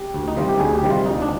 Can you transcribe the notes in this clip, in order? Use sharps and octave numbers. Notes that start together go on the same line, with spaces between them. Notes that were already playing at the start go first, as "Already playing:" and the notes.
Already playing: G4
D2
D#4
C3 D#3 G3 F4
G4
D2 G#4
G4
C3 D#3 G3
F4
D2 D#4
D4